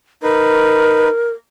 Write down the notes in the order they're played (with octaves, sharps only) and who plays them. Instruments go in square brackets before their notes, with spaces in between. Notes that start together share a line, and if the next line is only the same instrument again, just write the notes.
[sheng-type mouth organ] D#4 B4 [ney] A#4